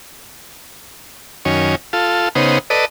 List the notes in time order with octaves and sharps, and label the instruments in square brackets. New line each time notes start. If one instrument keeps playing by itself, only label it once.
[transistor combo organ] F#2 D#3 C#4
F4 A4
C#3 B3 D#4 C5
A4 B4 D5 D#5